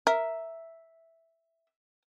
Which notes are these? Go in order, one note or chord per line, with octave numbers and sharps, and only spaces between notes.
A#4 E5